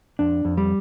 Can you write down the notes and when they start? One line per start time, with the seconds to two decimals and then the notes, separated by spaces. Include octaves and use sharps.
0.19 F2 D4
0.45 F2
0.57 G3